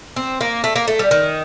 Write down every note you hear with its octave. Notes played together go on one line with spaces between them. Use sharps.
C4
A#3
A3
A#3
A3
G3
D#3